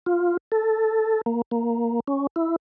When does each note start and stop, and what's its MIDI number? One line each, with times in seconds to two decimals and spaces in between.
0.06 0.37 65
0.52 1.21 69
1.26 1.42 58
1.51 2.00 58
2.08 2.27 61
2.36 2.56 64